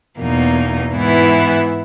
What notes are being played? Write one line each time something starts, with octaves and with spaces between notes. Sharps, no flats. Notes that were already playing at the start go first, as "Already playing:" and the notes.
E2 B2 A#3 D#4
G#2 E3 B3 E4